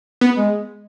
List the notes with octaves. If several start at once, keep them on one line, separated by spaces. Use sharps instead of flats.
B3
G#3